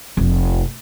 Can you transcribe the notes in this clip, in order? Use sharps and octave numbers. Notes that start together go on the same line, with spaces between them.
F1